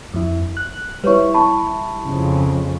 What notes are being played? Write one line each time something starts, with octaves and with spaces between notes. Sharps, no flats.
F2 E4
F#6
G3 E4 B4 C#5 C#6
A5 B5 C#6
F2 C#3